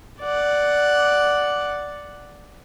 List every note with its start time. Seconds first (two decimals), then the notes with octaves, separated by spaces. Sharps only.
0.20 D5 F#5